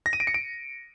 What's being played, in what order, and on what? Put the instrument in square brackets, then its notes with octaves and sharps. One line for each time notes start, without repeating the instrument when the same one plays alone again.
[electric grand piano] A#6
D#7
D7
C#7
D7